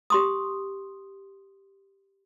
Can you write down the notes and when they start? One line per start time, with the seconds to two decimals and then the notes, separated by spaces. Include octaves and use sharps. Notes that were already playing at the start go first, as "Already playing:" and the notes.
0.10 G4 C6 D#6